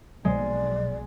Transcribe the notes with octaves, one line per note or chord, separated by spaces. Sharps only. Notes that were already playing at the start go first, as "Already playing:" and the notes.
B1 G#3 D5